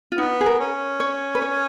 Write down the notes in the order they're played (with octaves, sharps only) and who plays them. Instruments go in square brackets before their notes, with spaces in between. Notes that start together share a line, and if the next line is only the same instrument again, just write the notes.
[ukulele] F4
[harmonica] B3 [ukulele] D#4
[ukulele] G#4
A#4
[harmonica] C#4
[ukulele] C#5
B4
C#5